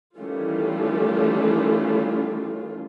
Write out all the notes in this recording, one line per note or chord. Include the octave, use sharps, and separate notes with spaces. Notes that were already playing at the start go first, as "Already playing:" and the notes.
D#3 E3 G3 A3 C#4 F4